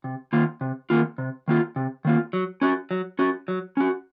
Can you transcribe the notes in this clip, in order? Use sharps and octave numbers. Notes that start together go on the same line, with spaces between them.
C3
D#3 A#3 F4
C3
D#3 A#3 F4
C3
D#3 A#3 F4
C3
D#3 A#3 F4
F#3
C#4 F#4
F#3
C#4 F#4
F#3
C#4 F#4